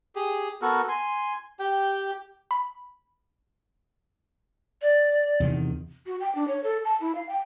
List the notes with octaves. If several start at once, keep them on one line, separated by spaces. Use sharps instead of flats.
G4 G#4
B3 F#4 A4 A#4
G#5 C6
G4 G5
B5
D5
E2 C3 D#3
F#4
G5
D4
C#5
A4
A5
E4
F5
G5